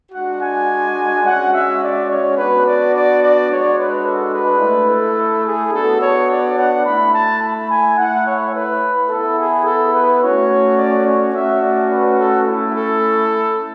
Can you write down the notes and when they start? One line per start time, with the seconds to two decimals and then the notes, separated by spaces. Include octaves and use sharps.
0.12 G#3 D4 F#4 F#5
0.40 G#5
1.24 G#3 C#4 F#4 F#5
1.51 E5
1.80 D5
2.08 C#5
2.36 B3 D4 F#4 B4
2.64 D5
2.92 D5
3.20 D5
3.48 G#3 D4 F#4 C#5
3.76 B4
4.04 A4
4.32 B4
4.59 A3 E4
4.88 A4
5.44 G#4
5.72 B3 D4 F#4 A4
6.00 C#5
6.29 D5
6.56 F#5
6.84 A3 E4 B5
7.12 A5
7.40 B5
7.68 G#5
7.96 A3 E4 F#5
8.24 C#5
8.52 B4
9.09 B3 E4 A4
9.37 G#4
9.65 A4
9.92 B4
10.20 A3 C#4 F#4 C#5
10.76 D5
11.04 C#5
11.32 A3 C#4 F#4 E5
11.60 D5
11.88 B4
12.17 A4
12.44 A3 C#4 E4 A4
12.73 A4